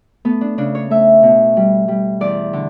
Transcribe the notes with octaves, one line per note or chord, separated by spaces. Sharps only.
A3 B3
D4
C#3 D4
C#5
A3 E5
B2
G3
G3
E2 D5
D3